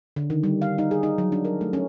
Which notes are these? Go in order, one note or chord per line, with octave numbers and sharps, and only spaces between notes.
D3
D#3
G3
F5
D#4
G#4
D#4
F#3
D4
A#4
A3
C#4